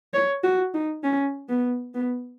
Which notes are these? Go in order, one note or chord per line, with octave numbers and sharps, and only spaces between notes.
C#5
F#4
D#4
C#4
B3
B3